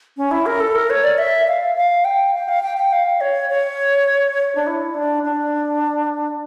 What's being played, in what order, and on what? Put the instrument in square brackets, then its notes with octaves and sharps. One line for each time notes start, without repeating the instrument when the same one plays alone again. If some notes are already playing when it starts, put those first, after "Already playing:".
[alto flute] C#4
E4
A#4
A4
A#4
C#5
D5
E5
F5
F5
G5
G5
F5
G5
G5
F5
C#5
C#5
D4
E4
D4
D4